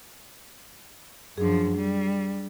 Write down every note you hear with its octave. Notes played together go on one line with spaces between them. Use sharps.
F#2 F3 D4 G#4
G3